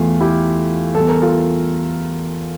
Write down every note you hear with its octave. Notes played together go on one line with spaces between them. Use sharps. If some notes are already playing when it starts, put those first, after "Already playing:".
Already playing: E2 E3 A3 F4
E4 G4
E2 E3 G3 A4
A#4
F4 A4